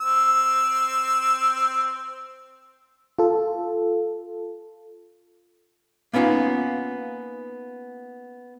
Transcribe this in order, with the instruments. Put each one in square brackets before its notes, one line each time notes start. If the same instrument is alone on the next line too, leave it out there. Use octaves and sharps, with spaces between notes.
[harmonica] C4 E6
[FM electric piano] F4 A4
[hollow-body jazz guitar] A#3 B3 C#4 D#4 F4